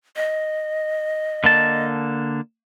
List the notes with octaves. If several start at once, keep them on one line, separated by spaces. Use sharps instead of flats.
D#5
D3 A#3 A5